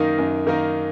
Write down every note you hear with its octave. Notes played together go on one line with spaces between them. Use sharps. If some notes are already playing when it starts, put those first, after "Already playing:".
Already playing: F#2 D#3 A#3 D#4 A#4
F#2
D#3 A#3 D#4 A#4